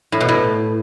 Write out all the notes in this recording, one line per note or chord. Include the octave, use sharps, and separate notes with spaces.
A2
B2
A2